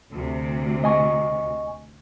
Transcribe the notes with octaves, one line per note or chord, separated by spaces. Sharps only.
D2 C3
D#5 G#5 C#6